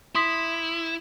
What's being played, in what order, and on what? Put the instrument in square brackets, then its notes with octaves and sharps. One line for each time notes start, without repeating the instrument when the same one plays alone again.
[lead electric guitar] E4 [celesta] C6 D#6 B6